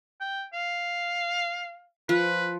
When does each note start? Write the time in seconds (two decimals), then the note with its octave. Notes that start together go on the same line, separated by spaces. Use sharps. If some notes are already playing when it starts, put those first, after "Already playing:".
0.21 G5
0.53 F5
2.09 F3 B4